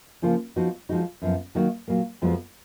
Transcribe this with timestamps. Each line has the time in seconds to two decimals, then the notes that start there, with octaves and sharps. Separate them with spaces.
0.22 C#3 F3 A#3 F4
0.56 F3 B3 D#4 F#4
0.89 F3 G#3 D#4 F#4
1.22 F#2 F3 B3
1.55 D#3 F#3 A#3 D#4 F#4
1.88 A#2 F#3 A#3
2.22 F2 F3 G#3 B3 F#4